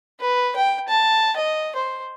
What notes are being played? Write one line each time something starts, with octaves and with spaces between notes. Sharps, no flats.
B4
G5
A5
D#5
C5